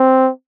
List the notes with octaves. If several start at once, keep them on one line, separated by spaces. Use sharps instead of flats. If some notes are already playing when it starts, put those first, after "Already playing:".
Already playing: C4